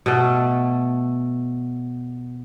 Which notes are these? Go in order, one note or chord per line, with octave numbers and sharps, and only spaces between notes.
B2 A3